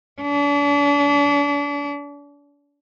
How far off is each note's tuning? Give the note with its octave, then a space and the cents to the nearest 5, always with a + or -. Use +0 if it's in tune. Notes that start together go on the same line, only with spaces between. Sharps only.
D4 -40